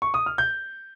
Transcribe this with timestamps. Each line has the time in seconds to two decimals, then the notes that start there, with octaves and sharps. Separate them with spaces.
0.02 C#6
0.14 D#6
0.26 F6
0.38 G6